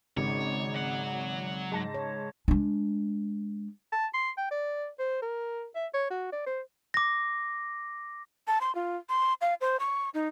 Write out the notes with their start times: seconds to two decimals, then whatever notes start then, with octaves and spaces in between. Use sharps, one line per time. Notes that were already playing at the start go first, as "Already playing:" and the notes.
0.17 G#1 C#3 G#3 D#4 C#5
0.74 F#3 F#5
1.72 G#2 A5 A#6
1.94 C#5
2.48 G#3 D4
3.92 A5
4.14 C6
4.38 G5
4.51 D5
4.99 C5
5.22 A#4
5.75 E5
5.94 C#5
6.10 F#4
6.32 D5
6.46 C5
6.94 D6 A#6
8.47 A5
8.61 C6
8.75 F4
9.09 C6
9.41 F5
9.61 C5
9.80 C#6
10.14 D#4